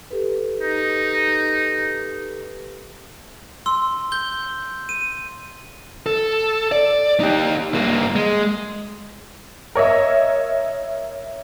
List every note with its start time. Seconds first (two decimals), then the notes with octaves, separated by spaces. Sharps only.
0.10 G4 A4 B4
0.61 D#4
3.66 C6 E6
4.12 G6 G7
4.89 D#7
6.06 A4
6.72 D5
7.20 D#4 G4
7.75 G2 A#3
8.16 G#3
9.75 A#4 C#5 D#5 E5